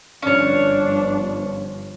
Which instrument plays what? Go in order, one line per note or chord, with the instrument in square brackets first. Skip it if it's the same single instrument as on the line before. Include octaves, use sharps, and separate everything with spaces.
[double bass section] G1 G2 F3 [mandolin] C#4 C#5 [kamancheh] D4